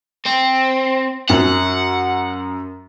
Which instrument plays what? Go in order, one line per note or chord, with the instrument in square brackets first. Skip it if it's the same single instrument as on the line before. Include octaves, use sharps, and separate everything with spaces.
[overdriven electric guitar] C4
[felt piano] F#2 [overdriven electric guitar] F#5